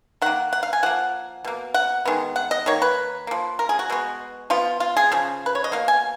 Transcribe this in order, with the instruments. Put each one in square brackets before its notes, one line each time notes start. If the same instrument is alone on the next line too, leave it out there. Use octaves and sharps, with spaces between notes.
[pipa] D#3 A#3 F#5
F#5
F5
G#5
F3 A#3 F#5
B2 A#3
F#5
D#3 G#3 B3
F#5
D#5
D#3 A#3 C#5
B4
F3 A#3
A#4
G#4
F#4
B2 G#3 B3
F3 B3 F4
F4
G#4
C#3 F3
B4
C#5
D#5
B2 A#3 F5
G#5